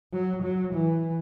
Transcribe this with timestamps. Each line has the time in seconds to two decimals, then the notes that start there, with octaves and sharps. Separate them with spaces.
0.13 F#3
0.43 F#3
0.74 E3